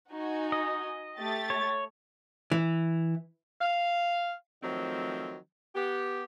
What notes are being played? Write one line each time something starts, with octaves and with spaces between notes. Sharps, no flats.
D#4 F#4 G#5
D#5
A3 G4 A6
C#5
E3
F5
D#3 F3 F#3 A3 C4
B3 G4